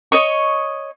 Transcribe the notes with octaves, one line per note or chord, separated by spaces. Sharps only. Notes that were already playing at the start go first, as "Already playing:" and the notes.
C#5 D#5 C#6